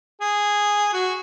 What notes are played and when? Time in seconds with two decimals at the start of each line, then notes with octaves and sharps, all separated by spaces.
0.21 G#4
0.93 F#4